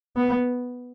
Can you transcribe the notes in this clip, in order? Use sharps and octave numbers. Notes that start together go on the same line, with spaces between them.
B3